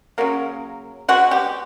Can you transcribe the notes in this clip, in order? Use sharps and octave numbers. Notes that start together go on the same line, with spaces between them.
C#3 F#3 A#3
B2 G#3 B3 F#4
G4